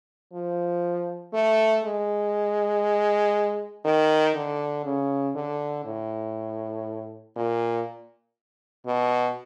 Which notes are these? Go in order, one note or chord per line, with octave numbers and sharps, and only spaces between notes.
F3
A3
G#3
D#3
D3
C#3
D3
A2
A#2
B2